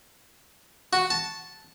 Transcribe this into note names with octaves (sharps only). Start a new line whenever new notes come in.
F#4
A5